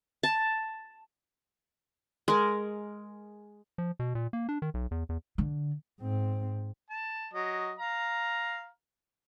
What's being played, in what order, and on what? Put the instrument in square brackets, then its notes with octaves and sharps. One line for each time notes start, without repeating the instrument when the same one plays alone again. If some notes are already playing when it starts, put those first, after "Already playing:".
[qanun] A5
G#3 A#4
[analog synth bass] F3
B2
A#2
A#3
D4
D#3
B1
E2
E2
[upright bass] D3
[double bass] G#2 C4
[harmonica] A5
F#3 D#5
F5 A#5